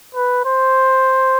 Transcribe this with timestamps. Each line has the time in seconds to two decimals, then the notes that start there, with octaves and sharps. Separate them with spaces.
0.14 B4
0.45 C5